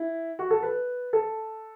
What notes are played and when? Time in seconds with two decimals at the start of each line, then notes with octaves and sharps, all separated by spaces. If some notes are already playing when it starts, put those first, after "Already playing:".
Already playing: E4
0.39 F#4
0.51 A4
0.63 B4
1.13 A4